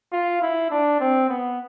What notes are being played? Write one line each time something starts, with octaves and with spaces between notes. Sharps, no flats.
F4
E4
D4
C4
B3